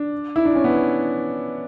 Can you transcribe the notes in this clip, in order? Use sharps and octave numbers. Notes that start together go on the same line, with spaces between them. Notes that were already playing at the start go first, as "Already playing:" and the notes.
Already playing: D4
E4
D4
C#4
B3